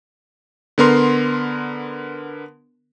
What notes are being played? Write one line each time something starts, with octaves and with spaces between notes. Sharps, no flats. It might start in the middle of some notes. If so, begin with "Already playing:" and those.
D3 B3 A#4 C6